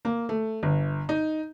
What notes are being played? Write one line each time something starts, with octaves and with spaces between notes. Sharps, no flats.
A#3
A3
G1
D#4